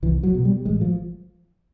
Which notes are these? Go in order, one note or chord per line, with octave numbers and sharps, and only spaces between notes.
C2 E3
F#3
B2
G3
A1 G#3
F3